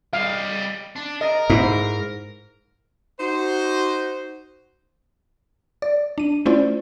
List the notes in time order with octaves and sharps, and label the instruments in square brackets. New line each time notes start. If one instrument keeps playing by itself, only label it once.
[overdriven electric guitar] G3 D#5 [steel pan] F5
[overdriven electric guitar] D4
[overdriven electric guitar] A#4 [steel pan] D#5
[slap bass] G#2 [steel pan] E4
[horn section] D#4 F#4 C5
[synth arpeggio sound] D5
D4 D#7
A3 C#4 E4 F4 C5 D5